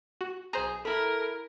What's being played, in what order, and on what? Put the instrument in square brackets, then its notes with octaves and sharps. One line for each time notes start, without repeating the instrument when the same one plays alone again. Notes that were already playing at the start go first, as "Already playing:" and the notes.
[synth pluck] F#4
[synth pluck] B1 C5 A#5 [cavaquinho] G#4
[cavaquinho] E4 B5 [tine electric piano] A4 [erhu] A#4